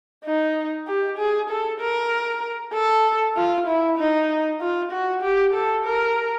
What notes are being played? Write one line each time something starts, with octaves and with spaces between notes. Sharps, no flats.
D#4
G4
G#4
A4
A#4
A4
F4
E4
D#4
F4
F#4
G4
A4
A#4